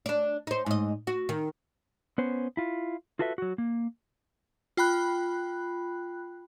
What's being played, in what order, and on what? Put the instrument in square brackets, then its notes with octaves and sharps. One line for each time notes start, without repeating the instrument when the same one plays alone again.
[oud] D4 D5
D#4 C5
G#2 D#5
F#4
D#3
[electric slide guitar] B3 C#4 C5
E4 F4
F4 F#4 A4 B4 E5
F#3 F#4
A#3
[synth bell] F4 G5 B5 F#6